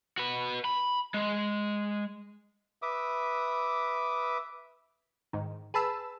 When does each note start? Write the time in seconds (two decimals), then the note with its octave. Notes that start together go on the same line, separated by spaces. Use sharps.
0.18 F#4 B4
0.65 B5
1.14 G#3
2.82 B4 E5 D6 D#6
5.33 G#2 D#3
5.74 G#4 B4 A5 B5 E6